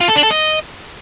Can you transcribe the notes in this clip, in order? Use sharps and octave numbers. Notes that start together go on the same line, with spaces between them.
F4
A4
D4
A4
D#5